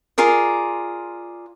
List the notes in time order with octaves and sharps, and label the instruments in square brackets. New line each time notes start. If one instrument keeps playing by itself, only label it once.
[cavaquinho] F4 G#4 A#4 D5